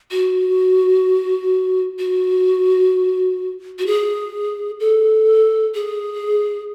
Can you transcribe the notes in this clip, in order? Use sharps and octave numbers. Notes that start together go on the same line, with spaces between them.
F#4
F#4
F#4
G#4
A4
G#4